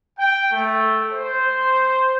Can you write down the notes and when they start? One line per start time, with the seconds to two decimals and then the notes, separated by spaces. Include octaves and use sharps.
0.18 G5
0.51 A3
1.12 C5